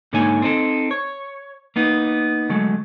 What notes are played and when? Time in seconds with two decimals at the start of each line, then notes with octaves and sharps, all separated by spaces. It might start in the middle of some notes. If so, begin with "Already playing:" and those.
0.13 G#2 D3 A#3 D#4 C#5 G#5
0.42 C4 D#4 A4
0.91 C#5
1.76 A#3 B3 D#4
2.49 D3 F#3 G#3 A3